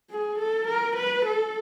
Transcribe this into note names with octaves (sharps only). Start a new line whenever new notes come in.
G#4
A4
A#4
B4
A4